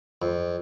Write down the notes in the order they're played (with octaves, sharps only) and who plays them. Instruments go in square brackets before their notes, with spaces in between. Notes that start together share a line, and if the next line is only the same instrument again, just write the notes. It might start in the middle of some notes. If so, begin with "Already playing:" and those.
[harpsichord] F2